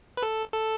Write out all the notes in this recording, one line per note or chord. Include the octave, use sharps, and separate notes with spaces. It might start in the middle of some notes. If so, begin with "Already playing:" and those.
B4
A4
A4